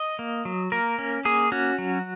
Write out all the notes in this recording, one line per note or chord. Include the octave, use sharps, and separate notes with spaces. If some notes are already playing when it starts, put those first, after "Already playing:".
Already playing: D#5
A#3
F#3
A#3 A#4
C#4
A#3 G#4
C#4 F#4
F#3